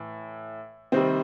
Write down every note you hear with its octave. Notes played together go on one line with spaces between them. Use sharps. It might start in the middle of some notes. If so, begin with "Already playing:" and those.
Already playing: A2 E3
C3 D#3 G3 C4